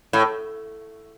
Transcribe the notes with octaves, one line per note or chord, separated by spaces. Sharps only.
A2